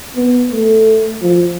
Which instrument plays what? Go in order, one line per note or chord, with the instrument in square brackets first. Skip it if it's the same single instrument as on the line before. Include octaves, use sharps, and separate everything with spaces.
[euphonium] B3
A3
F3